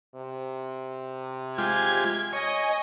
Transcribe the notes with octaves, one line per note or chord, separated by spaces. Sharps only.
C3
G#3 F4 G4 G#6
C#5 D#5 G#5